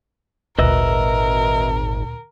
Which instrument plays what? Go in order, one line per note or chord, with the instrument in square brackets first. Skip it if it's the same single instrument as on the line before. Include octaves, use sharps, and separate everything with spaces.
[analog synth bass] G#1 [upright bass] D2 A#2 [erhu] A#4 [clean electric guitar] B4 D#5 E5